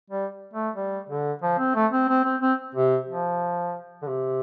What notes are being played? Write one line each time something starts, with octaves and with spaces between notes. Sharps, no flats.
G3
A3
G3
D3
F3
C4
A3
C4
C4
C4
C4
C3
F3
D3
C3